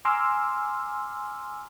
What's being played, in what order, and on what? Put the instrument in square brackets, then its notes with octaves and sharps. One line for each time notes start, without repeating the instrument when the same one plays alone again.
[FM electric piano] G#5 A#5 C6 D6 E6 F6